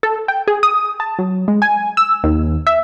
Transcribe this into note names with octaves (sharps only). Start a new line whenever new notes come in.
A4
G5
G#4
D#6
A5
F#3
G#3
G#5
E6
D#2
E5